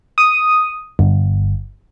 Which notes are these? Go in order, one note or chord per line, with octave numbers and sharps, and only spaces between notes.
D#6
G1